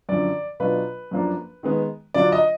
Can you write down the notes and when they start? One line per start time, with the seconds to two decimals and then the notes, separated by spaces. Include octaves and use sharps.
0.09 F#2 D3 F3 D5
0.60 B2 F#3 D4 F4 B4
1.11 F#2 F3 A#3 D4
1.63 D#3 G#3 B3
2.14 D3 F#3 D4 F4 D5
2.32 D#5